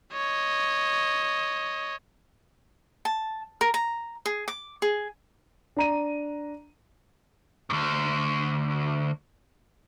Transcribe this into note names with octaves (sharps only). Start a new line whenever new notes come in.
C#5 D#5
A5
A#4
A#5
G#4
D6
G#4
D4 A#5 D#7
D2 G2